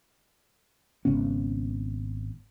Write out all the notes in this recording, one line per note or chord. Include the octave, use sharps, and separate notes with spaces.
G#1 C#3 B3 C#4